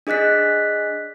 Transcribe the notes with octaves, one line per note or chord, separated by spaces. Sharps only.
D4 G#4 D#5 F#6 B6